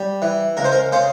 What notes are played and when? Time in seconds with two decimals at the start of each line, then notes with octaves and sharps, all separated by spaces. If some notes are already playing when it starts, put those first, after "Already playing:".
Already playing: G3
0.22 E3
0.57 C#2 A#4
0.64 C5
0.72 A#4
0.92 C#3 C5